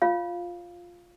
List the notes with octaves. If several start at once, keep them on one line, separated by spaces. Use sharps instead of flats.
F4 C#5 F5